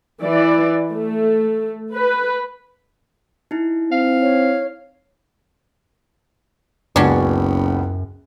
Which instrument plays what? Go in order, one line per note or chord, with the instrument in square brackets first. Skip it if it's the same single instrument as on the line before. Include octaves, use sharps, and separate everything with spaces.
[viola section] E3 D5
A3
B4
[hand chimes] D#4 E4
[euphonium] C4 [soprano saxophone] F5
[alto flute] C#5
[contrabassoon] F#1 [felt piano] C#2 B3 F#4 [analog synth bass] F#2 [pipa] C#4 D4